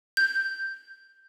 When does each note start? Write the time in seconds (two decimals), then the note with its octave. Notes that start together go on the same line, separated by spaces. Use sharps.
0.17 G6